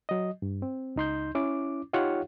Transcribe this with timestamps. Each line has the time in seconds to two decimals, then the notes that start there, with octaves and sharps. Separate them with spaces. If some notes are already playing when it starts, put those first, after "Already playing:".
0.09 F#3 D#5
0.42 G2
0.62 C4
0.96 C#2 D#4 C6 G6
1.35 C#4 E4 D6
1.93 D#4 F4 G4 C#5 F5 F#5